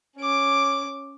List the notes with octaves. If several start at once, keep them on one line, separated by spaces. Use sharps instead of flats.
C#4 D6